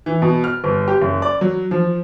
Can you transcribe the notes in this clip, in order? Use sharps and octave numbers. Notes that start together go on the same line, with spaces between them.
E3
B2
F6
G1
G4
F#1
D5
F#3
F3